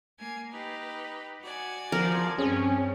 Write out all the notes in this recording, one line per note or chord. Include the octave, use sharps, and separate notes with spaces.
A#3 G#5
D#4 G4 B4
F#4 D5 G#5
F3 A#4
G2 C4 C#4 G#4 C#5